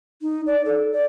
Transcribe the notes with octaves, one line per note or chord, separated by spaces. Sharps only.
D#4
D5
A4
D5